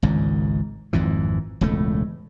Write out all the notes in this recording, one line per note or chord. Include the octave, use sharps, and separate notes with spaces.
G#1 C#2 G#2
G#1 F2 G#2 E3
E1 C#2 A2 A3